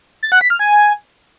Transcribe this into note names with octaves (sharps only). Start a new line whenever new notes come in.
A6
F#5
B6
F6
G#5